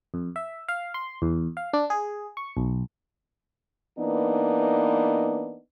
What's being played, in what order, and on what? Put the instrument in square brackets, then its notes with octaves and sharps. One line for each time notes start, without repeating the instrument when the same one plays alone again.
[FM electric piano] F2
E5
F5
C6
E2
F5
D4
G#4
C#6
B1
[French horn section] E3 A#3 B3 D4 D#4